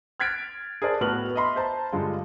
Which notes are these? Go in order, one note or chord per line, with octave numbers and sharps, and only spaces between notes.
F6 F#6 G#6 A6 B6 D7
G#4 A#4 C5 D5 A5
A2 B3 F#4 B4 F6 F#7
D#5 E5 B5 C6
C5 A5 A#5
G2 D3 G#3 F4